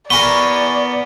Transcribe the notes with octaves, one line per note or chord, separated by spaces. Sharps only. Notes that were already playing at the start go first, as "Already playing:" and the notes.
B3 A#4 B4 D5 G#5 C#6 G7